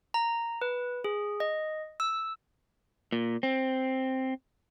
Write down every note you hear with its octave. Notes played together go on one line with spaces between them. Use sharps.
A#5
B4
G#4
D#5
E6
A#2
C4